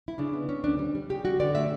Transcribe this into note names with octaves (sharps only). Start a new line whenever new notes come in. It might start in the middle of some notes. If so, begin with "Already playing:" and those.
E4
C#3 D4
B3
C#3 C#4
D2 D4
G3
G3
C#3 G4
G3 F#4
D3 D5
A3 E5